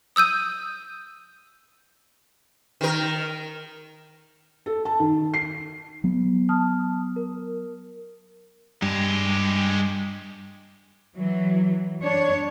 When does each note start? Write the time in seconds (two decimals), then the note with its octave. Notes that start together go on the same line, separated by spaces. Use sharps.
0.16 D#6 E6 G6 D#7
2.81 D#3 A#4
4.66 A4
4.85 A5
5.00 D#3
5.34 C7
6.04 F#3 B3
6.49 A5 D#6 F6
7.16 A#4
8.82 G2 G#3 G4
11.16 E3 F#3
12.02 D4 C#5